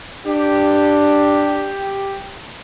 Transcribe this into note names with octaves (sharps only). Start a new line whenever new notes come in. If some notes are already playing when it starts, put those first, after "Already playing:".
D4 G4